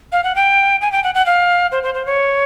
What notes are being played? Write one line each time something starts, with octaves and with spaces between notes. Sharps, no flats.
F5
F#5
G5
G#5
G5
F#5
F#5
F5
C5
C5
C5
C#5